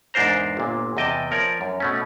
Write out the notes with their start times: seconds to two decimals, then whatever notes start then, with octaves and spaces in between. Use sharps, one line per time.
0.14 E2 G#2 D4 A#4 C5 A#5
0.57 G1 A#2
0.97 E2 C3 D#5 G5 A5
1.31 F3 A#4 C#5 D5
1.61 F#2
1.80 B2 A3 C#4